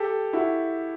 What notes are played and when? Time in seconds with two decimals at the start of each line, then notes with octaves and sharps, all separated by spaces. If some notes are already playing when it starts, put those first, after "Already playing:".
Already playing: G4 A4
0.33 E4 F#4